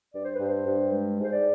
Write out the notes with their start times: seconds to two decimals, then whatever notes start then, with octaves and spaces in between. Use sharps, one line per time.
0.13 G2 D5
0.25 C5
0.36 G2 B4
0.47 C5
0.66 G2
0.92 G#3
1.19 G#2 C5
1.33 D5